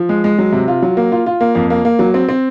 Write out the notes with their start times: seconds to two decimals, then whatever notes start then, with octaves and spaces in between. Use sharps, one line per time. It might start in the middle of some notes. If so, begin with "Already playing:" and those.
Already playing: F3
0.09 G#3
0.24 G#3
0.38 F#3
0.52 C3
0.68 F4
0.82 F#3
0.97 A#3
1.12 F4
1.26 F4
1.41 A#3
1.55 F2
1.70 A#3
1.85 A#3
1.99 F#3
2.14 C4
2.29 C4